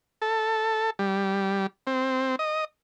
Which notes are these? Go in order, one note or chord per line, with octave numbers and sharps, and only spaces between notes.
A4
G3
C4
D#5